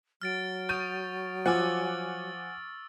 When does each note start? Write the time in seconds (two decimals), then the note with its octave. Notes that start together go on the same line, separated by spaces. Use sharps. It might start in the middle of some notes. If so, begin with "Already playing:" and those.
0.22 F#3 F6 A6 D7
0.69 C#6 D#6 G6 A6 D#7
1.46 F3 F#5 G#5 D6 E6 F6 A6